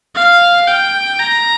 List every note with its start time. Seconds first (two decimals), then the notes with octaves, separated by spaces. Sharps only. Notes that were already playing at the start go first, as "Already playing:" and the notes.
0.15 F5
0.67 G5
1.19 A#5